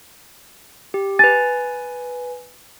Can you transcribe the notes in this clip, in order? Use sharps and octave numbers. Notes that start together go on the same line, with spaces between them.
G4
B4 G#5 A6